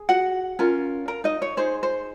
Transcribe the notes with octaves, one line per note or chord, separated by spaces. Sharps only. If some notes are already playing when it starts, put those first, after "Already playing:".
Already playing: G#4
F#4 F#5
C#4 F4 A#4
A#4 A#5
D#4 D#5
C#5
D#4 G#4 C5
C5